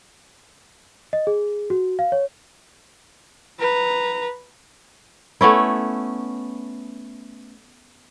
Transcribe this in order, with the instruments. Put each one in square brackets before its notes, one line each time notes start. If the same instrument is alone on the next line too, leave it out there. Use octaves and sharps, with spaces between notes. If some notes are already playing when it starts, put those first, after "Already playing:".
[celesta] D#5
G#4
F#4
F5
C#5
[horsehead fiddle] B4 A#5
[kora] A3 B3 C#4 E4